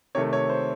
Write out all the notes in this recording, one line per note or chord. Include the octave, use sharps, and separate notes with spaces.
C3 D#3 A3 C#5
C#5
C5